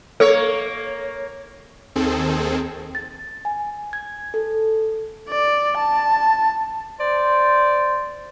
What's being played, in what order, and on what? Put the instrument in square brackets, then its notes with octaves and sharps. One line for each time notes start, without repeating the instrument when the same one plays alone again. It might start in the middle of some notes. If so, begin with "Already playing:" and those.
[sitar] A#3 C#5 [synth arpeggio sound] A4
[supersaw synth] D#2 D#3 C4 G#4 A4
[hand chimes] A6
G#5
G#6
A4
[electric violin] D5
A5
[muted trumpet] C5 [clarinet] D5